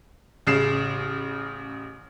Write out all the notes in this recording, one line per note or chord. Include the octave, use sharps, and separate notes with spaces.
A1 C#3 C7 E7